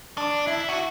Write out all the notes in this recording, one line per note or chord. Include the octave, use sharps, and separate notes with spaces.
D4
E4
F#4